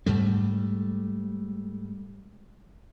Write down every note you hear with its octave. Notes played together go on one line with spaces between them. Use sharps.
G#2 G3 A3